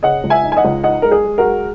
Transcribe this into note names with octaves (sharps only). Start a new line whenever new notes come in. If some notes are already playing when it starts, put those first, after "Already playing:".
C#3 D#5 F#5
C#2
E5 G#5
D#4
G#5
D#5 F#5
C#2
D#4 D#5 F#5
G#3 A#4
G#4
G#3
F#4 A#4
G#3